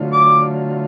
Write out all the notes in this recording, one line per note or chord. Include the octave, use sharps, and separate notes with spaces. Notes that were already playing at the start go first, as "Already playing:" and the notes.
Already playing: D3 F#3 A3 F4
D6